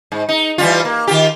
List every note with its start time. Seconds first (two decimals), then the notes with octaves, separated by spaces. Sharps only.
0.12 G#2
0.29 D#4
0.58 E3 G3 F4
0.85 A#3
1.08 D#3 F4 G4